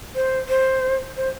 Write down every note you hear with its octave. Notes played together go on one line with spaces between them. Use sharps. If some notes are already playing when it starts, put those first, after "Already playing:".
C5
C5
C5